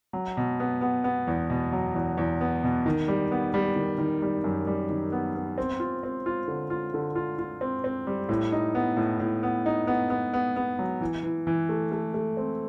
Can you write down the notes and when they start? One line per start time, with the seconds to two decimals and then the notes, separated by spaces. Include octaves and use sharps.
0.13 F#3
0.37 B2
0.60 B3
0.81 B3
1.04 B3
1.27 E2
1.50 B2
1.73 F#3
1.95 E2
2.17 E2
2.41 B3
2.64 B2
2.86 D#3
3.08 G3
3.31 B3
3.54 G3
3.76 D#3
3.98 D#3
4.22 G3
4.44 F#2
4.67 G3
4.89 D#3
5.12 B3
5.35 B3
5.58 C4
5.80 F4
6.03 C4
6.26 F4
6.48 D3
6.70 F4
6.94 D3
7.15 F4
7.38 F4
7.61 C4
7.84 C4
8.07 G3
8.29 A2
8.52 D#4
8.75 B3
8.97 A2
9.20 A2
9.43 B3
9.66 D#4
9.87 B3
10.10 B3
10.33 B3
10.56 B3
10.79 F#3
11.01 E3
11.23 E3
11.47 E3
11.69 A3
11.92 A3
12.14 A3
12.37 C4